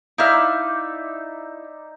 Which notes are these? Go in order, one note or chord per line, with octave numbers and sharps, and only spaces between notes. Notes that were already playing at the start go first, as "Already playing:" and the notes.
D#4 E4 D5 E5 F5